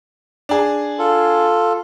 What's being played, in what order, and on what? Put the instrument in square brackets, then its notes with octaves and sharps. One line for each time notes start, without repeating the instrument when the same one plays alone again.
[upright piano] D4 G#4
[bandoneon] F4 A4